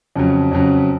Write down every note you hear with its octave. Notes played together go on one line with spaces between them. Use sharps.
F2 C#3 F#3
F2 C#3 F#3